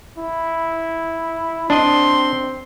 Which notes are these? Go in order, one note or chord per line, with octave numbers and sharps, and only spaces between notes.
E4
C4 D4 D#5 C6